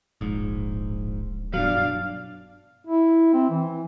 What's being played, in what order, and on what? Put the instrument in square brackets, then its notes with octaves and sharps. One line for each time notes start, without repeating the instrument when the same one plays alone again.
[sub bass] D1 [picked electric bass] A#1 G#2
[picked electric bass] G2 B2 F#3 [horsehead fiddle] D4 F5
[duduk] E4
C4
E3